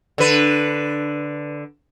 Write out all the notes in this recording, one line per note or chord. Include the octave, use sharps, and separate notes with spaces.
D3 B4